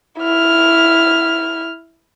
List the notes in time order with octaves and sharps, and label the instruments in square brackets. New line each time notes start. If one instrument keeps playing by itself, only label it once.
[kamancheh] E4 F6